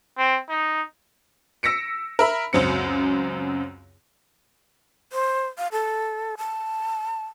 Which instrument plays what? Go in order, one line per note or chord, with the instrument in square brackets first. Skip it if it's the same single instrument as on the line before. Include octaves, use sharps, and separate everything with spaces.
[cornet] C4
D#4
[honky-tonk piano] E6 A#6 B6 C#7 D7
A#4 E5 B5
C#2 F#2 F#3 C4 C#7
[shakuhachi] C5
F5
A4
A5